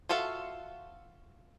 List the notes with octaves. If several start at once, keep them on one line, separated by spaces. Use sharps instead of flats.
F4 F#4 A4 E5 F5